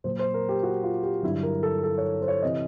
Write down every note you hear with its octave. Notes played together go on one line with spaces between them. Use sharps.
A#2 F#3 C5
C5
A#4
G4
F#4
F4
G4
G2 D3 F#3 E4
A#4
A4
A4
C#5
C5
C#5
C3 E3 D#5